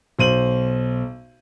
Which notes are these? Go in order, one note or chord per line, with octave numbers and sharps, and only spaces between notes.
B1 C5 D#7 F#7